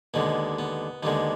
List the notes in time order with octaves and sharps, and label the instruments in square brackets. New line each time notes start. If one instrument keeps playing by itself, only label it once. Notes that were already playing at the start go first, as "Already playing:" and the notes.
[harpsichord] D#2 D3 G#3 B3
B3
D#2 D3 G#3 B3